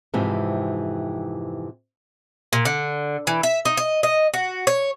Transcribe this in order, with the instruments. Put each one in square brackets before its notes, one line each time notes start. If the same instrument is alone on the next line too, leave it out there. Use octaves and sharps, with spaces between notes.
[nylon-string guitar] F2 G#2 C3 E3
[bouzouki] A#2
D3
E3
E5
D#4
D#5
D#5
F#4
C#5